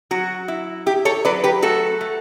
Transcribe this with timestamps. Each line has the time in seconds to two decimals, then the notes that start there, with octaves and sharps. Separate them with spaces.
0.11 F#3 F#4
0.48 E4
0.86 E4 G4
1.05 A4 C#5
1.25 F#3 B4 D5
1.44 G4 B4
1.62 A3 F#4 A4
2.01 A3